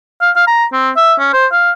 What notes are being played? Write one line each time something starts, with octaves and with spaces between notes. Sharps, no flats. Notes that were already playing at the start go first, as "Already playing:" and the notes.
F5
F5
A#5
C4
E5
C#4
C5
F5